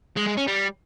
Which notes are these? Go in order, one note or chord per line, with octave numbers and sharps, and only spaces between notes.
G#3
G#3
C#4
G3